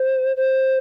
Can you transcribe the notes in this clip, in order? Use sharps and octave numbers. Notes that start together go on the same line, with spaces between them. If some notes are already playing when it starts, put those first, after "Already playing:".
Already playing: C5
C5